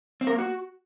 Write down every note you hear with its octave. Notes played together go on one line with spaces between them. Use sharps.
C4
A#4
A#3
F#4